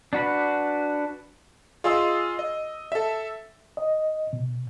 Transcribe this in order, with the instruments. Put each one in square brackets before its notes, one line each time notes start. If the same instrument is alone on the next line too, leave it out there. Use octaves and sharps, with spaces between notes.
[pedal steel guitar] D4 F#4 B4
[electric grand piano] F4 G#4 D#5 C6 E6
D#5
A4 E5
[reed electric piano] D#5
B2